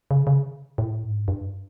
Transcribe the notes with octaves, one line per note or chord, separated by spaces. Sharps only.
C#3
D3
C#3
A2
G#2
G2